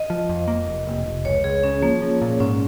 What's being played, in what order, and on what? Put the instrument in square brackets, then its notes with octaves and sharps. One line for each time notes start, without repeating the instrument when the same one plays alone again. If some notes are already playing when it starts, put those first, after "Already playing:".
Already playing: [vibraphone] D#5
[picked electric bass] F3
F2
A#3
F1
F1
F1
[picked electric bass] C#2 [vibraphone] C#5
[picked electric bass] C#2 [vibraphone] G#4
[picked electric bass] C#3 [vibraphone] C#4
[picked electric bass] F3 [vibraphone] A#3
[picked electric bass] F3
A#2
[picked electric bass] G#2 [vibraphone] C#4